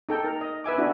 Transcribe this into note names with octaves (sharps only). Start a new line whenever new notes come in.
D#4 A4 G5
A#4
D#5
B4 E5 G#5 D6
D4 E4 F#4 G#5